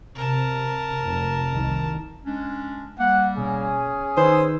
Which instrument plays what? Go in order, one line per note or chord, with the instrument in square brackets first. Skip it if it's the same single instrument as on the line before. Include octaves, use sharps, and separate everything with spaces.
[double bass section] C3 [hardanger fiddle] A#4 A5
[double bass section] F1
C2 D#3
[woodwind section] G#3 C#4 D4
[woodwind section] G3 A#3 [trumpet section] F#5
[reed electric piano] B2 [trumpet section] C#4 G#4
[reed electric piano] D#3 D#4 B4 [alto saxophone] C5 [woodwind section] G#5 D#6 E6